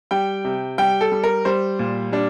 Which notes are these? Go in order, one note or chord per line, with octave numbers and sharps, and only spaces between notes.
G3 G5
C3
G3 G5
A4
G3
A#4
G3 C5
A#2
G3 D4